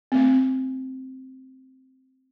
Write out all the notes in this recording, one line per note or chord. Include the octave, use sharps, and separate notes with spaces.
A3 C4